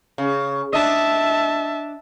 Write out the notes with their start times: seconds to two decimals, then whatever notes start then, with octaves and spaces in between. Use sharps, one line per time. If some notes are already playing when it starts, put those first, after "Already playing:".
0.18 C#3
0.73 D4 D#5 E5 A5